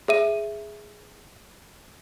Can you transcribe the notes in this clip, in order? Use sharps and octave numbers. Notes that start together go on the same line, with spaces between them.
G#4 E5 D#7